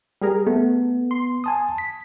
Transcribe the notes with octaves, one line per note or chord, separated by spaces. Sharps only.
G3 G#4 A#4
A3 B3
C6
G#5 A5 D#6
B6